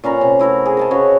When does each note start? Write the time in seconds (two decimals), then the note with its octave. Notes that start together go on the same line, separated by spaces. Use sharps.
0.04 A#2 C#4 B4 A#5
0.21 C3
0.39 A3 E4 F#4 A#4
0.66 G#4
0.77 A#4 D#5 A5
0.91 C#3 F#4 B4 C#5